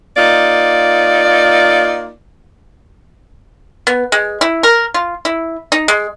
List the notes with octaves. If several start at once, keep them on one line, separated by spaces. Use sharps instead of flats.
A#3 D#4 F4 D5
B3
G#3
E4
A#4
F4
E4
D#4
G#3